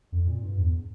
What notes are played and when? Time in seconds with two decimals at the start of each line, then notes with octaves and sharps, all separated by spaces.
0.12 F2
0.27 A#2
0.43 G2
0.58 E2